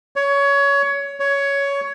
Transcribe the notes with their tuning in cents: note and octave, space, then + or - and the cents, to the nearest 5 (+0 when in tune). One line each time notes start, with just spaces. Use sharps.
C#5 +20
C#5 +15